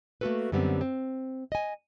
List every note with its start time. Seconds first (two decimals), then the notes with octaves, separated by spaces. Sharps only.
0.21 A3 A#3 D#4 F#4 A4 B4
0.52 F#2 D3 G3 B3 C4
0.81 C4
1.52 D#5 G#5